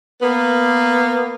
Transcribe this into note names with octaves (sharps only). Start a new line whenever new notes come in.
A#3 B3